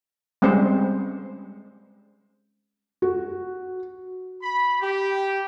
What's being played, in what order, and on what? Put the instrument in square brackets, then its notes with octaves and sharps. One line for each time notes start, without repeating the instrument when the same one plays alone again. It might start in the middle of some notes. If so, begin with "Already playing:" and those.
[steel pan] G3 G#3 C4 C#4 C5
[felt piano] F#4
[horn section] B5
G4